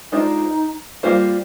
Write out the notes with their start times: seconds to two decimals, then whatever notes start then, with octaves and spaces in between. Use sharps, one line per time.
0.12 G#3 D4 D#4 F4 C5 D#5
1.03 G3 A#3 F4 C5